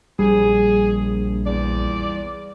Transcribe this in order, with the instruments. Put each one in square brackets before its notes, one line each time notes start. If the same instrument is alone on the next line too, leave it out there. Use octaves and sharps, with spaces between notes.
[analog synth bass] A#1 [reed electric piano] G3 [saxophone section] G#4
[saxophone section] E2 D5